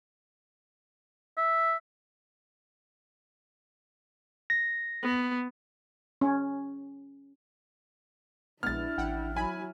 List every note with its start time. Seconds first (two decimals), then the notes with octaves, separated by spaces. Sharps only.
1.38 E5
4.50 A#6
5.03 B3
6.21 C#4
8.63 A#1 G#3 B3 D4 E4 F6 A6
8.98 A1 F#5 G5
9.36 F#3 E4 G#5 B5